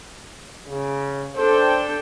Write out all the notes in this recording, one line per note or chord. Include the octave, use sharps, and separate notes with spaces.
C#3
D4 A4 C5 G5